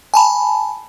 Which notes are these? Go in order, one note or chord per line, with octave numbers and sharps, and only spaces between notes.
G#5 A5 B5